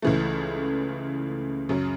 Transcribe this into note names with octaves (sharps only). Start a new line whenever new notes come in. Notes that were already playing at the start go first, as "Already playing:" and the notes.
C#2 C#3 E3 A3
F#2 C#3 F#3